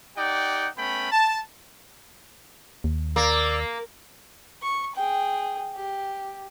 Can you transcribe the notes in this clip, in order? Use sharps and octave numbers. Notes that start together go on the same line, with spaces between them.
D#4 G4 D5 F#5 G5
A3 B3 C#4 G5 B5
A5
D#2
A#3 D5 E6
C#6
G#4 G5
G4